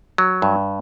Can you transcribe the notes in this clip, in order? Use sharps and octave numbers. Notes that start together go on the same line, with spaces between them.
F#3
G2